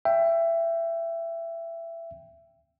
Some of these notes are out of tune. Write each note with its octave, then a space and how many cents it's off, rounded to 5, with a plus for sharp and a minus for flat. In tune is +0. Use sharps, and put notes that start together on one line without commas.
E5 +20 G5 +0